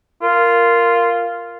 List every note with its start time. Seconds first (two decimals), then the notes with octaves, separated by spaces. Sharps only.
0.22 F4 A#4